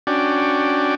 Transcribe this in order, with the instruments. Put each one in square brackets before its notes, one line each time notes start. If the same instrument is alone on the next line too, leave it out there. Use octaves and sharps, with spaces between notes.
[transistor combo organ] C#4 D4 F#4 D5 G5